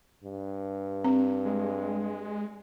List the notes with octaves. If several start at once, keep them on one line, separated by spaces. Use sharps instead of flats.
G2
C4
G#3